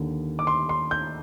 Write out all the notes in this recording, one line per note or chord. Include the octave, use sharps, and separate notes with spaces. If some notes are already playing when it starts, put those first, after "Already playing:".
Already playing: D#2 D3
D6
C6
C6
G6